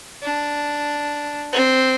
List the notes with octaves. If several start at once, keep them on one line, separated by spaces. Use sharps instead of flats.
D4
C4